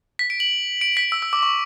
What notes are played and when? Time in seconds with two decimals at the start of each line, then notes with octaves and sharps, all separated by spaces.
0.19 B6
0.30 D7
0.40 F#7
0.81 D7
0.97 B6
1.12 E6
1.22 E6
1.33 D6
1.43 C#6